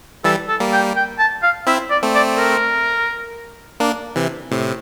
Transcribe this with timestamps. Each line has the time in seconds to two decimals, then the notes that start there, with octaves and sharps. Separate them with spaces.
0.24 E3 G3 A4
0.48 A4
0.60 G3 A#3
0.73 G5
0.96 G5
1.19 A5
1.43 F5
1.67 C4 E4 E5
1.91 D5
2.03 A3 C4
2.15 D5
2.38 A#4
3.80 A#3 D4
4.16 C3 E3
4.51 A2 C3